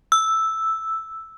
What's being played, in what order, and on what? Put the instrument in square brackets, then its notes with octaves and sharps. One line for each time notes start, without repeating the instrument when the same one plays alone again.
[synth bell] E6